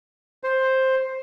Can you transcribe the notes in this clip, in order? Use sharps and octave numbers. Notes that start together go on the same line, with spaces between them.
C5